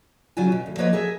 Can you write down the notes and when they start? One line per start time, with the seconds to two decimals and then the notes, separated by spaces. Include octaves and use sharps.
0.37 C#3 F#3 F4 F#4 G#5
0.52 B2
0.66 D2
0.78 F3 A#3 B4 C#5 D#5
0.93 G#4 A#4 E5